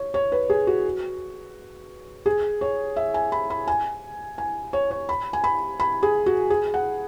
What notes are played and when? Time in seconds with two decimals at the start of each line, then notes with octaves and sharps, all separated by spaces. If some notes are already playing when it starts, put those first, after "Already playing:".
Already playing: C#5
0.14 C#5
0.32 B4
0.50 G#4
0.67 F#4
2.26 G#4
2.61 C#5
2.96 E5
3.14 G#5
3.32 B5
3.50 B5
3.68 G#5
4.38 G#5
4.73 C#5
4.91 C#5
5.09 B5
5.33 G#5
5.44 B5
5.80 B5
6.03 G#4
6.26 F#4
6.50 G#4
6.74 F#5